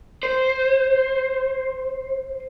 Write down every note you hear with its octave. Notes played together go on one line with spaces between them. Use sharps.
C5